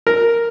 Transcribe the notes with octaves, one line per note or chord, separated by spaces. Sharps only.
A#4